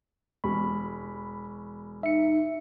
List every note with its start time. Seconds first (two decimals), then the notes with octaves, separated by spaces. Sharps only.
0.44 E1 B5 C#6
2.03 D#4 E5 C#7